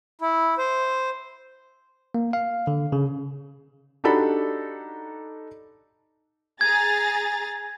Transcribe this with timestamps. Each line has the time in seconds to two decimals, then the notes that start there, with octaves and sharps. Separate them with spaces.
0.21 E4
0.58 C5
2.15 A#3
2.33 F5
2.67 D3
2.92 C#3
4.04 D4 D#4 F#4 G4 A4 B5
6.61 G#4 A#5 G#6 A6